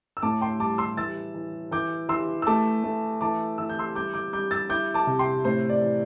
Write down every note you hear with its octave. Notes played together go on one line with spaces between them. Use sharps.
E6
A2 A5 D6
G5 C6
G3 A5 D6
C6 E6
E3 E6 A6
E3
E3 D6 G6
E3 C6 E6
E6
A3 A5 D6
A3
E3 A5 D6
E3 E6
G6
C6 E6
G3 D6 G6
D6 G6
G3 D6 G6
E6 A6
E4 D6 G6
A5 D6
C3
G5 C6
A2 C5
D5
E3